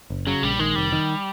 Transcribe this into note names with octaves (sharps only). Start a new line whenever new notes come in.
F#1
C#3 F#3
A#1 G3
D#3 G#3
F1 G3
D#3